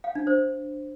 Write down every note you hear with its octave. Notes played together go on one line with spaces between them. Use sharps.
F5
D4
C5